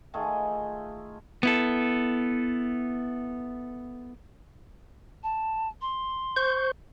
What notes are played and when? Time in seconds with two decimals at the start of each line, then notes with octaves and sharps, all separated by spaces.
0.14 D#3 A3 F4 G#4
1.43 B3 E4 A4
5.23 A5
5.81 C6
6.36 C5 C#6 G6